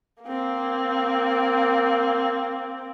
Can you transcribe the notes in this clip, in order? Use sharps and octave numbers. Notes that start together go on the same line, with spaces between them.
A#3 C4